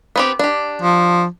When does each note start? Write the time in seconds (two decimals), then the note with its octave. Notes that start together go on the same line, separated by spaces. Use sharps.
0.16 B3 C4 G4
0.39 D4 G4
0.82 F3